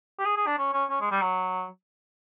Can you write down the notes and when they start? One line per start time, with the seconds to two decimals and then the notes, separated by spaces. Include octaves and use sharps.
0.19 G4
0.25 G#4
0.37 G#4
0.47 D4
0.58 C#4
0.73 C#4
0.90 C#4
1.01 G#3
1.11 G3
1.22 F#3